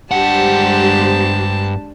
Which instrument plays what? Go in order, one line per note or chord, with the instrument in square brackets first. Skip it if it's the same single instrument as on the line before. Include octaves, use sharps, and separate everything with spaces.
[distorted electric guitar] G2 F#5 [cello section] G#3 G4 C5 [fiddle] D4 A5